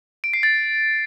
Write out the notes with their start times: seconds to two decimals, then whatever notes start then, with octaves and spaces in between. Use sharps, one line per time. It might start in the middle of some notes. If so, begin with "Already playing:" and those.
0.24 D7
0.33 C7
0.43 A6